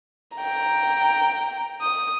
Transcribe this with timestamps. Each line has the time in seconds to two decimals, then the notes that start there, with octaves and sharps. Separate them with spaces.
0.37 G5 A#5
1.82 D#6